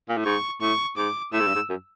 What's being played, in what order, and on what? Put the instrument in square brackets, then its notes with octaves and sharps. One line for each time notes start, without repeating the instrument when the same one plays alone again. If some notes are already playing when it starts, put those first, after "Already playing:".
[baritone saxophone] A#2
A2
[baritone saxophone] G#2 [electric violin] C#6
[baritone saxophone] A2 [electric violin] C#6
[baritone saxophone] G#2 [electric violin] D6
[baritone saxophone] A2 [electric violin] E6
[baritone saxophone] G#2
G2
G#2
F#2